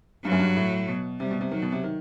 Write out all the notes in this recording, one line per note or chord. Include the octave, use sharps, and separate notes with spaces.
G2 F#3
F#2
G2
A2
B2
C3 G3
B2
C3
D#3 F#3
B2
C3
D#3